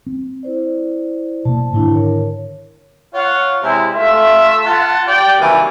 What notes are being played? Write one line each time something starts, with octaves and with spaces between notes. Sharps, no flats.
C4
E4 C5 D5
B2 A#3 A5
G#2 D3 D#3 D4 E4 A5
A#4 C#5
F4 C#5 F5 F#5
C3 G#3 C4 E4
A3 F4 E5
F4 F#5 A5
G4 D5 G5
C3 D#3 E3 F#3 G3 A#3